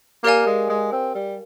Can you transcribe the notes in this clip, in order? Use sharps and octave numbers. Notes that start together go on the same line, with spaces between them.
A#3 G4 A#4 D5 F5 G#5
G#3
G#3
C4
G3